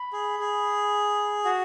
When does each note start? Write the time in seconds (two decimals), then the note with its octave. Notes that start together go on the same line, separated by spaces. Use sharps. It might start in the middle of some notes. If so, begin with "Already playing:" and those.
Already playing: B5
0.13 G#4
0.39 G#4
1.45 F#4 F#5